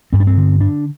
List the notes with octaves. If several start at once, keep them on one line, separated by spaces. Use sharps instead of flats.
G2 C4
D4
C4
D3
D3 D4